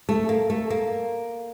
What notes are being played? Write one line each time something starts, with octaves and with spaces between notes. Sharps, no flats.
A3
A#3
A3
A#3